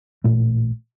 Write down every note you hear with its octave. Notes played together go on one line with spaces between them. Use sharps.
A1 A#2 A3